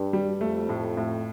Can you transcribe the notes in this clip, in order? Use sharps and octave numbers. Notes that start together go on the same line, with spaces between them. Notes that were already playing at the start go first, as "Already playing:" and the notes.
Already playing: G2
G3
F2 A3
A2
A2